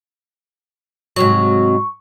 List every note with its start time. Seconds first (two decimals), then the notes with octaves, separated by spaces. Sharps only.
1.16 G#2 C3 F#3 C#6